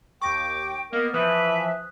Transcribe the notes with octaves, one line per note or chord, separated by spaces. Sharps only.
D#2 G5 C#6 D6 A#6
A#3 B3 A#4 D#5
E3 F3 B4 E5 D#6 F#6